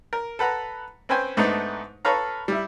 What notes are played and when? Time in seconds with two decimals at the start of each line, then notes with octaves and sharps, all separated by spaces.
0.13 A#4
0.39 A4 B4 F#5 A#5
1.09 C4 C#4 B4 C5 G5 G#5
1.37 G#2 A3 B3 D4 D#4
2.05 A4 B4 C#5 F5 A#5
2.48 G3 E4